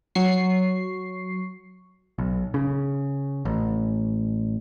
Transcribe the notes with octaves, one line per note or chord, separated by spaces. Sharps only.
F#3 C#6 C7
B1
C#3
A1